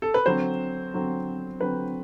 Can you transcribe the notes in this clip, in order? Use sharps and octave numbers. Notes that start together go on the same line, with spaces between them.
A4
B4
D3 F#3 C4 C5
D3 F#3 C4
D3 F#3 C4 B4